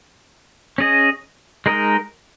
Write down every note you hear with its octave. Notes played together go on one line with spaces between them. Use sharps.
C#4 G#4 D#5
G#3 D#4 A#4 D#5